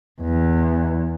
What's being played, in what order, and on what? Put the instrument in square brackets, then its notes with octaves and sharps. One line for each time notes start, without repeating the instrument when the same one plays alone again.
[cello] E2